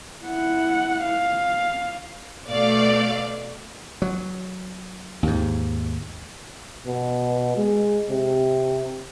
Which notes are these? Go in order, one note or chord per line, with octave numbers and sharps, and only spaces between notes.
E4 F#5
F5
B2 A3 D5 F5
F#3
D#2 G#2
B2
G#3
C3